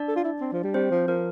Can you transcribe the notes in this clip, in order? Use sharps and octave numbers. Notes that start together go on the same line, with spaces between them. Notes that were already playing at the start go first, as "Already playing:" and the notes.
Already playing: D4 D5
A4
F4
E4
C4
F3
G3
G3 C4 C5
F3
F3 A#4